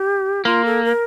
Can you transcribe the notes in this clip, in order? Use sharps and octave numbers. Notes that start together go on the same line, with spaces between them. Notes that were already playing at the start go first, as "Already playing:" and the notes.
Already playing: G4
A#3 F4
A4
A#4